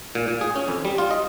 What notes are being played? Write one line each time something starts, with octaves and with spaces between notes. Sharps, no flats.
A#2
A#2
G#4
C#4
F2
G3
F4
D#5